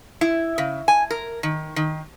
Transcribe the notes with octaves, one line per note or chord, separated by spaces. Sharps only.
E4
C#3
G#5
A#4
D#3
D#3